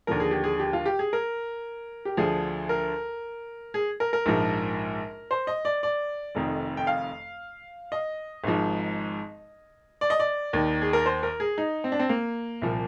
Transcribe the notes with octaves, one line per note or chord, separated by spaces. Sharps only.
D#2 D3 F3 A#4
G#4
G4
G#4
G4
F4
G4
G#4
A#4
G4
D2 D3 F3 G#4
A#4
G#4
A#4
A#4
A#1 G#2 F3
C5
D#5
D5
D5
F1 F2 D#3
G5
F5
D#5
G#1 G#2 F3
D5
D#5
D5
D#2 D#3
G#4
A#4
C5
A#4
G#4
D#4
C4
D4
C4
A#3
C2 A#2 F3